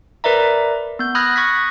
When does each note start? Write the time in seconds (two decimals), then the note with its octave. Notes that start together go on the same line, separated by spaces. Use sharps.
0.24 A#4 B4 D5 E5 A#5
0.99 B3 G6
1.15 B5 D#6 F6 F#6 G#6 A#6
1.36 C#6 D#6 F#6 G#6 A#6 B6